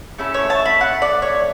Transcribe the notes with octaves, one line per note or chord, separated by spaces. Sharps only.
A3 C#4 E4 A4
C#5
A5
B5
F#5
D5
C#5